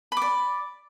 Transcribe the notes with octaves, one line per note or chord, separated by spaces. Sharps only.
D5 B5 D6